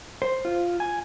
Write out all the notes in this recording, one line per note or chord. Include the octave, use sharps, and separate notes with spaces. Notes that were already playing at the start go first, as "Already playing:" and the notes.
C5
F4
G#5